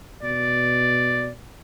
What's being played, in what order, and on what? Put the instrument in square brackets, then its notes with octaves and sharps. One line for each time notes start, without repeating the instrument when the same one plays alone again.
[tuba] B2 [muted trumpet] D5